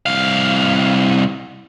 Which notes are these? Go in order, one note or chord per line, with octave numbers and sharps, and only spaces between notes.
C2 F5